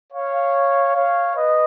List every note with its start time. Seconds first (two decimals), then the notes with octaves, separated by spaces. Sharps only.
0.12 C#5 F5
0.94 C#5 F5
1.35 B4 D#5